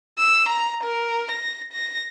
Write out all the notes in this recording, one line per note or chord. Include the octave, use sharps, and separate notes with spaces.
E6
A#5
A#4
A#6
A#6